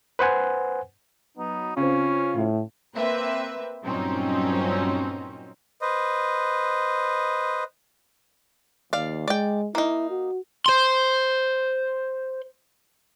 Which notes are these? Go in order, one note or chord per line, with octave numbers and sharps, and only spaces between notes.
B4 C5 F#5 G#5
F#3 B3 D#4
C#3 C4 C#4 F4
A2
A#3 C4 B4 E5
G2 A#2 F#3 C4 C#4 D#4
B4 C5 D#5
D#2 D5 F5
G#3 D5 G5
A#3 D#4 E4
F#4
C5 C6